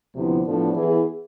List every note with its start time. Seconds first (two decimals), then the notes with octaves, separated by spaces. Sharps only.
0.15 D2 C3 F3 B3 E4
0.45 A2 F3 B3 D4 A4
0.76 E3 B3 E4 G#4